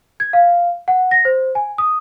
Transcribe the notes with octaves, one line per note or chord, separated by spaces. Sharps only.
G#6
F5
F#5
A#6
C5
G#5
D#6